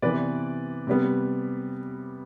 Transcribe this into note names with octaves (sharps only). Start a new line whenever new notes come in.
C3 E3 B3 B4 D5
C3 G3 B3